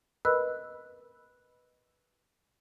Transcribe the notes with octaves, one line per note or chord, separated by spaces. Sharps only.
A#4 B4 D#5 B5 E6 F#6